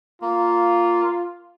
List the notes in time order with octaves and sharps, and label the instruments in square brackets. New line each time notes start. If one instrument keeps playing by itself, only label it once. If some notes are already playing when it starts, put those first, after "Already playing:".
[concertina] A#3 [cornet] F4